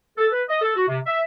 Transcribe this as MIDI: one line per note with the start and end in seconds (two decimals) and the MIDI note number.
0.18 0.27 69
0.33 0.43 71
0.49 0.59 75
0.62 0.73 69
0.76 0.85 66
0.88 1.00 48
1.07 1.23 76